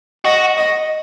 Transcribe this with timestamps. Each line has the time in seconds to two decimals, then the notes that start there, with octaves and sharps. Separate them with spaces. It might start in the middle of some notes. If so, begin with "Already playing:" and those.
0.25 F#4 D#5
0.57 D#5